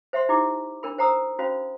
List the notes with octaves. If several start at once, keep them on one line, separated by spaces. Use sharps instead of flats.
C5 E5 F#5 C6
D#4 E4 G4 D6
D4 A#4 B5
C5 F#5 A#5 D#6 E6
C#4 F#4 C5 F5 B5